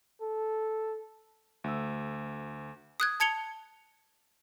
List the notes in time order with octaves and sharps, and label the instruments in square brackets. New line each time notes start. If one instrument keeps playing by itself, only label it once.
[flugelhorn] A4
[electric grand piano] D2 E6
[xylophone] D#6 F#6 G#6
A5 G#6 C#7 F7 G7